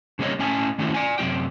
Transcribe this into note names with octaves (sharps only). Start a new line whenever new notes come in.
C#3 G3 A#3 C#5 D#5
A2 C#4 D#5 G#5 A5
D#3 A3 C#4 D4 E4 F#4
D5 G#5
F#2 C3 A#3 F#4 G5